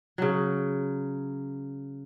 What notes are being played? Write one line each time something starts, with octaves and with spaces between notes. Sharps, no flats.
C#3 F#3